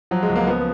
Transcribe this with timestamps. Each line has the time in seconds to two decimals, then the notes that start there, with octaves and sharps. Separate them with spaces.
0.11 F3 F#3
0.23 G#3
0.30 C#2
0.36 A#3
0.47 F3 B3